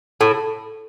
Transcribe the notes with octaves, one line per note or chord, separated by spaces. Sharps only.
A2